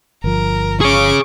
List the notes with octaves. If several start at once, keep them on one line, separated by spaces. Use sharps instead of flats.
G1 F3 A#4
G#4 C#5 C#6 D6